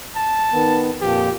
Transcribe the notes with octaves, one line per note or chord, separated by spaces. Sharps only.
A5
D#3 B3
F2 A#2 F3 G4